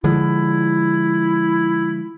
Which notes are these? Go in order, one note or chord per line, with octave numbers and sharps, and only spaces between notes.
D3 F3 G#3 E4